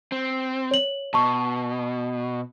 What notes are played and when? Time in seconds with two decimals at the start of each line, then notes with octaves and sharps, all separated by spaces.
0.12 C4
0.71 C#5 F#7
1.14 B2 A5 C#6